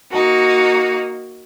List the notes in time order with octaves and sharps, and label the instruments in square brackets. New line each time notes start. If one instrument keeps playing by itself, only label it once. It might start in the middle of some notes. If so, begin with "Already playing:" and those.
[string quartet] A#3 D#4 F#4